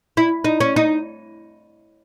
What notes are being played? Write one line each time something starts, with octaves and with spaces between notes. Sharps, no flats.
E4
D#4
C#4
D#4